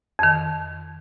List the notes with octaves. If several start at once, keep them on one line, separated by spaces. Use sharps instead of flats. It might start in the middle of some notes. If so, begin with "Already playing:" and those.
F2 D#3